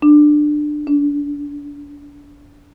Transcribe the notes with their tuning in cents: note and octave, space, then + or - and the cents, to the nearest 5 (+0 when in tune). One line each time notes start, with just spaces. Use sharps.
D4 +20
D4 -30